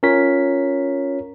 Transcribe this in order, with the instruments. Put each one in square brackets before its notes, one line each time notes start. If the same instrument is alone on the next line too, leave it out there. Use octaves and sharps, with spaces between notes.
[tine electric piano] C#4 F4 A#4 C#5 B6